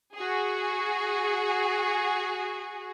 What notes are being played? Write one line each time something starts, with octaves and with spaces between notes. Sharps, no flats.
F#4 G#4